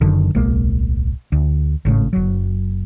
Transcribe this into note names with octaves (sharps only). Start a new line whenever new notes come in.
F#1 F#2 D3 D#3
D1 B1 G#3 A#3
D2
G#1 A2 C#3
F#1 F#3